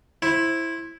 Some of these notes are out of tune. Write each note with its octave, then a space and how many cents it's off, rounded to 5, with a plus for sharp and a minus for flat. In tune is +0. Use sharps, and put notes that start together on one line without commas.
E4 +0 C5 +20